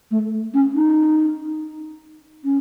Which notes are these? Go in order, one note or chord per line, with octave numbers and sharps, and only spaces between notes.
A3
C#4
D#4
C#4